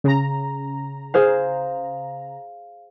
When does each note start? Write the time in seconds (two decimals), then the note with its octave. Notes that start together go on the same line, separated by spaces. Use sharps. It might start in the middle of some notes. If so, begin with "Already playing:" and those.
0.04 C#3 A#5
1.14 G#4 C5 F5